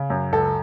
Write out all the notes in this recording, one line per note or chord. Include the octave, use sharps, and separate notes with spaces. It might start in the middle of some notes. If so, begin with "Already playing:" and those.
Already playing: C#3
F#2
C#2 A4